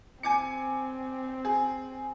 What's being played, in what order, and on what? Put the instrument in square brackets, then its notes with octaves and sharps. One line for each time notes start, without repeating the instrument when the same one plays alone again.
[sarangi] C4 [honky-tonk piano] G#5 D6 C#7
[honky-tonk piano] G#4